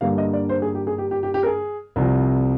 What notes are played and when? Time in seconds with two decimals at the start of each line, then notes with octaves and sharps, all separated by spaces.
0.01 G2 D3 G3 A#3 F5
0.18 D#5
0.33 D5
0.49 C5
0.62 G#4
0.75 G4
0.87 G#4
0.98 G4
1.11 G4
1.23 G4
1.34 G4
1.43 A#4
1.46 G#4
1.96 C2 C3 F3